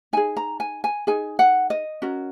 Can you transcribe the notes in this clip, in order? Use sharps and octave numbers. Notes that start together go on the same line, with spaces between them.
D#4 G#4 G#5
A#5
G#5
G#5
D#4 G#4 G#5
F#5
D#5
C#4 F#4 A#4